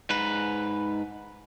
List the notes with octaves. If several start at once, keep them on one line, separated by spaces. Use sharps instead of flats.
G#2 B4